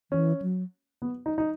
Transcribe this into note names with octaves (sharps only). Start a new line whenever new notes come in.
E3 C#4
F#3
B3
D#4
D#4